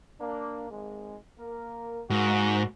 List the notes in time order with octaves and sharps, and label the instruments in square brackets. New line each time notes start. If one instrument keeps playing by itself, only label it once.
[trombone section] A#3 D4
G#1 G#3
A#3 A#4
[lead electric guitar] G#2 [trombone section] A#3 F#4